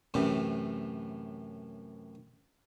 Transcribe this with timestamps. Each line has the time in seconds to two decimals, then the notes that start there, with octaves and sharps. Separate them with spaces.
0.14 F#2 A2 C3 E3